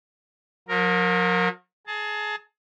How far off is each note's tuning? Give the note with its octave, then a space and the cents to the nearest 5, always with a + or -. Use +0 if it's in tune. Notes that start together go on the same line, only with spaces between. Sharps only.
F#3 -45 A#4 +0
G#4 +25 A5 +25